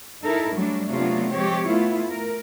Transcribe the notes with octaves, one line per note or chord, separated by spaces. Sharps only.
D#4 E4 A4 A#4
F#3 G3 A3 D4
C3 F#3 A3 B3 D4 F4
F3 G#3 C4 G4 C#5
A3 B3 E4 F4
A#4